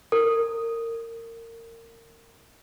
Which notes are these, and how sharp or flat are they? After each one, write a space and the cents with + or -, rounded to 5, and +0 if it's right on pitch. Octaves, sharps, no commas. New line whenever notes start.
A#4 -25